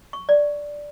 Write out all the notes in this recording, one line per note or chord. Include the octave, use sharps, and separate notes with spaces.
C#6
D5